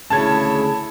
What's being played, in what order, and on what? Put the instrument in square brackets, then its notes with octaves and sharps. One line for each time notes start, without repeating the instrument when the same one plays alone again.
[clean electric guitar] D2 C#3 [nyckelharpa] E4 C#5 [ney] G#4 [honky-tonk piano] A5 G#6